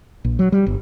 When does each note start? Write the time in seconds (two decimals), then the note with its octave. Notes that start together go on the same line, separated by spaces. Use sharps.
0.25 A#1
0.39 F#3
0.52 G3
0.66 G1